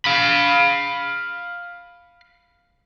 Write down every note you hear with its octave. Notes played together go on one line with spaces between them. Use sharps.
F5 B5